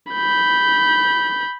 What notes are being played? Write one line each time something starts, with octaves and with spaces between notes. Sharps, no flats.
B5 G6